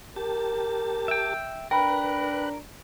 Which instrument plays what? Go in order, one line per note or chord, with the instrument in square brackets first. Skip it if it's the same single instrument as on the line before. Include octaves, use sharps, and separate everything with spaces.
[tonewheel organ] G4 A5 [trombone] A#4
[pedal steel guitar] E5 G5
[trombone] D4 [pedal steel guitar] A#4 [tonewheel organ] B4 F#6 [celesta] G5 B5